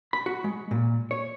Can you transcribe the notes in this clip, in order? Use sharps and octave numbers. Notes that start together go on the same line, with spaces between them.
B5
F#4
G#3
A#2
C#5